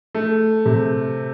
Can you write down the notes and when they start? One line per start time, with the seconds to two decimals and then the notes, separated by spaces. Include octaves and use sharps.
0.15 A3
0.66 C3